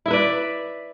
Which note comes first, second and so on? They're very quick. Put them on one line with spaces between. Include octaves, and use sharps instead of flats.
E4 E5 B4 D5